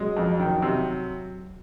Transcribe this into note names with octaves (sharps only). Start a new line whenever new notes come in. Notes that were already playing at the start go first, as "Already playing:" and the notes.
Already playing: F#3 G#3
F2
D#3
C3